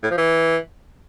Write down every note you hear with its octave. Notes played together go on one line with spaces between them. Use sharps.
A2
F3
E3